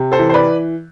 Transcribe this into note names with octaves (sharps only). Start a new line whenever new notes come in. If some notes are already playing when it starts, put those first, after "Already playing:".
Already playing: C3
A4 C5
E3
C5
B4 D5